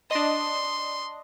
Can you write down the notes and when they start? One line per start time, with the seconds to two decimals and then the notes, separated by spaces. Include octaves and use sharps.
0.11 D4 D#5 C6